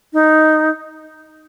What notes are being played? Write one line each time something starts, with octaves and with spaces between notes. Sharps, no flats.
D#4